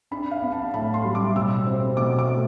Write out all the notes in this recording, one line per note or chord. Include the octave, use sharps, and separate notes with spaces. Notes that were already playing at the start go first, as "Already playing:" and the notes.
D4 B5
F5
B3
A5
A2 B5
C6
G3
D6
B2 E6
C4
B2 D6
D6
A3